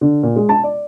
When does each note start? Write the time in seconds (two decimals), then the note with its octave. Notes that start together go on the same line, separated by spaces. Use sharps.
0.01 D3
0.23 A#2
0.36 G#3
0.49 A5
0.64 D5